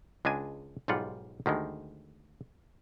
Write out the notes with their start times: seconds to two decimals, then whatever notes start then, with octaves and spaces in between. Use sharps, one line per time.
0.25 C#2 G#3 D4 G#5
0.88 B1 G#2 G3 F4 F#5
1.46 D2 D#3 G3 G#3